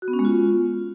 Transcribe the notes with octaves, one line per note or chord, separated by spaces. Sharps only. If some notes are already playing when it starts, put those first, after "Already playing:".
F#4
B3
C#4
G#3
F4